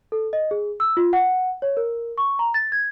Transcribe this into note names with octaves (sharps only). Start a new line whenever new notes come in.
A4
D#5
G#4
E6
F4
F#5
C#5
A#4
C#6
A#5
A6
G#6